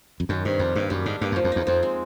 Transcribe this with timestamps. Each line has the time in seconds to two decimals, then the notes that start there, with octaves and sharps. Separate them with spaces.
0.20 F2
0.29 F#2 D#3
0.45 G2 C3
0.59 F2 G3
0.75 G2 A#3
0.90 F#2 G3
1.06 G#2 D4
1.21 G2 A#3
1.32 F#2 F3
1.44 F2
1.52 E2 D#4
1.67 F2 C4
1.83 G#3